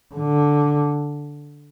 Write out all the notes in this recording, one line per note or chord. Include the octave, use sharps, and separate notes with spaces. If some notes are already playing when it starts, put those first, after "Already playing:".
D3